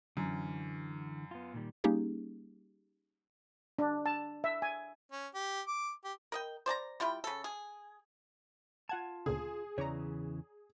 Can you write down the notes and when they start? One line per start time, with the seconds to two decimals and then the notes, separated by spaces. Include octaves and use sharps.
0.17 F#2 D3 E3
1.31 B3 F4
1.54 A#2 D#3 G3
1.84 G3 A#3 C#4 D#4 G4 G#4
3.79 D4
4.06 A5
4.44 E5
4.62 G#5
5.12 C#4
5.34 G4
5.67 D6
6.04 G4
6.32 A#4 D#5 G5
6.66 C5 D5 A5 A#5
7.00 G3 E4 F4 G5
7.24 C#3 A4
7.44 G#4
8.89 F4 F#5 A5 G#6
9.26 D2 A#2 C#3 G#4
9.78 E2 C#3 E3 C#5 D5 A#5